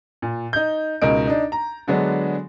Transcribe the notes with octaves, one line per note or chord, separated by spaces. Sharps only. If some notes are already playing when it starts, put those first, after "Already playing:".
A#2
D#4 G6
C#2 B2 D#4 A#4 D#5 D7
D4 D#4
A#5
D3 F#3 G#3 B3 D4